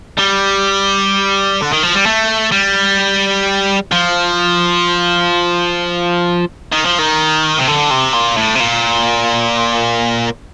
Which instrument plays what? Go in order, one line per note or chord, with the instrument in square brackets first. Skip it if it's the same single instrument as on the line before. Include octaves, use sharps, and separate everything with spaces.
[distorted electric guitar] G3
D3
D#3
F3
G3
A3
G3
F3
D#3
F3
D#3
C3
D3
C3
A#2
A2
C3
A#2